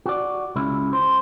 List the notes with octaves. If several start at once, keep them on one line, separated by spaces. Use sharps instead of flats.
F#4 D5
C#2 C#3 E4
C5